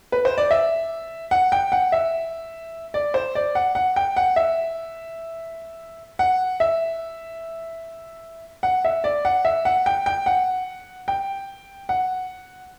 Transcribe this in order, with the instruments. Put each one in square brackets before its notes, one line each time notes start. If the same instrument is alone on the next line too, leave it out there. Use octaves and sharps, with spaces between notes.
[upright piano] B4
C5
D5
E5
F#5
G5
F#5
E5
D5
C5
D5
F#5
F#5
G5
F#5
E5
F#5
E5
F#5
E5
D5
F#5
E5
F#5
G5
G5
F#5
G5
F#5